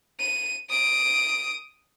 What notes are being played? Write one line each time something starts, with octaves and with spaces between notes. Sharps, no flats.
D#7
D#6 D7